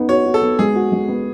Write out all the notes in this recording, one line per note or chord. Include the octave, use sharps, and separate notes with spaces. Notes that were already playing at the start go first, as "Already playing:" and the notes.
Already playing: B3 D#4
F#4 C#5
F#4
A4
B3
G#3 G#4
F#4
G#3
B3